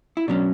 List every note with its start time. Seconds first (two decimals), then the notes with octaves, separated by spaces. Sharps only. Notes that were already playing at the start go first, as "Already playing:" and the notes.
0.17 E4
0.28 B2 F#3 C#4 D4